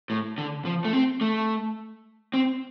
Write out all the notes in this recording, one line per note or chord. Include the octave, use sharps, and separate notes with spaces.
A2
D3
F3
A3
C4
A3
C4